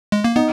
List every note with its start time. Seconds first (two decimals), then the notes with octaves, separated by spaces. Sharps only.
0.12 G#3
0.24 A#3
0.36 B3 D#4